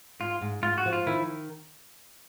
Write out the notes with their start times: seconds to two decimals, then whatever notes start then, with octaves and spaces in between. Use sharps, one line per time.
0.20 G#2 F4
0.41 G#2
0.63 G#2 F4
0.78 F#4
0.86 F3
0.93 F4
1.07 D#3 E4